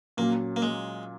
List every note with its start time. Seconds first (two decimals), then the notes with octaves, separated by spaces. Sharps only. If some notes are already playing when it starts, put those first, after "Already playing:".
0.17 A#2 F#3 A#3 C#4
0.56 A#3
0.62 G#3